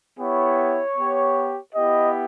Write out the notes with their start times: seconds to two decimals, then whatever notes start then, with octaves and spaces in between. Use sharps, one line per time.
0.19 B3 E4 G4 C#5
0.97 B3 G4
1.75 B3 E4 G4 D#5